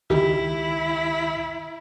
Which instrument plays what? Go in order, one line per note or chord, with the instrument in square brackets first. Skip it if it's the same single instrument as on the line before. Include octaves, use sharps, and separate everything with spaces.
[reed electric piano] C#2 D#3 [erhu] E4 [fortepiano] G4